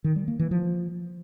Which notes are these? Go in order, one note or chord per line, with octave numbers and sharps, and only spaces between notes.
D#3
G3
A#3
E3
F3